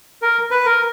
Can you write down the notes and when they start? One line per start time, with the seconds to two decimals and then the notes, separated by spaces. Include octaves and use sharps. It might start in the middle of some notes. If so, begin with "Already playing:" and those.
0.22 A#4
0.51 B4
0.66 A#4